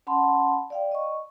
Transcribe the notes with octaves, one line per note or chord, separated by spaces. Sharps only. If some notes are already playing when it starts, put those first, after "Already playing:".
C#4 F#5 A5 B5 C6
D5 F5 G5
D#5 C#6